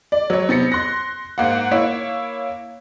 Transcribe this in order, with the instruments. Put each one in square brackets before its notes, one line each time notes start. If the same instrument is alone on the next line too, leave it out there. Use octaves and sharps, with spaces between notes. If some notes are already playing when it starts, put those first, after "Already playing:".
[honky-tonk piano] D5
F#3 C#5
C3 B3 A#6 C#7
C6 F#6 A#6
G#2 A#3 F#5
A#3 E4 C#5